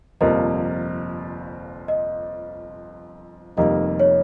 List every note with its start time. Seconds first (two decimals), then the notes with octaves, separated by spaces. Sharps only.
0.21 G1 F2 C3 F3 A#3 D#5
1.88 D#5
3.57 F1 F2 D#3 G3 A#3 D#5
4.00 C#5